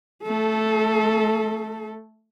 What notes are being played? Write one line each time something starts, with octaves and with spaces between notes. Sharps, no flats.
A3 A4